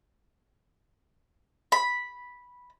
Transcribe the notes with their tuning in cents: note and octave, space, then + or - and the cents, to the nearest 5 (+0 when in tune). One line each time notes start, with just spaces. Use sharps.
B5 -5